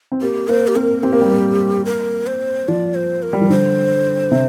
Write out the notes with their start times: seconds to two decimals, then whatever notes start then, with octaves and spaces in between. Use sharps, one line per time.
0.12 C4
0.21 A#3 G4
0.48 A#3 C5
0.67 G4
0.75 C4 A#4
1.03 C4 G4
1.12 A#3
1.21 G3
1.31 A#3
1.85 A#4
2.27 C5
2.68 F3 D5
2.95 C5
3.23 A#4
3.33 G3
3.41 F3
3.50 D3 C5
4.31 C3